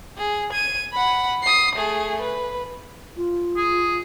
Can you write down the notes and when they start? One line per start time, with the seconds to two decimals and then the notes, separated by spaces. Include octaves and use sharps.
0.18 G#4
0.52 G#6 D#7
0.93 F#5 B5
1.43 D#6 C7
1.76 A3 G#4
2.22 B4
3.16 F4
3.57 G#4